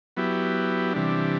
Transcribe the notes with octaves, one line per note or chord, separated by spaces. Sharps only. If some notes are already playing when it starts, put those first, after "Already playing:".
F#3 B3 E4 G4
C3 E3 G3 D4